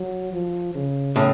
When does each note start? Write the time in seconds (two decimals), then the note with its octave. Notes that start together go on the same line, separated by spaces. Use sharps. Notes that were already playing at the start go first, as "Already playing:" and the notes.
Already playing: F#3
0.33 F3
0.75 C#3
1.16 A2 C#3